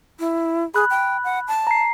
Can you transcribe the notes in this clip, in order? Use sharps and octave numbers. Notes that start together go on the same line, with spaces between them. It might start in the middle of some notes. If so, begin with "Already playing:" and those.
E4
G#4 B5 F#6
G5
F#5
A5
A#5 C7